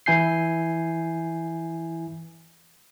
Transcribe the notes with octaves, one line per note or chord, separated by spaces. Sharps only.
E3 E4 G#5 G6 C7